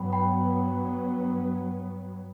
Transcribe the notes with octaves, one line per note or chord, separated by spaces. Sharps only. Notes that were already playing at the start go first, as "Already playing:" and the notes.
Already playing: G2 F#3 B3 G5 B5
G5 B5